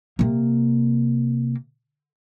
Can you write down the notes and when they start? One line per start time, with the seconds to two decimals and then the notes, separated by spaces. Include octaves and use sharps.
0.19 C3 A#3